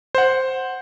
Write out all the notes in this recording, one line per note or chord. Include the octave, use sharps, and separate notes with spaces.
C5 F#5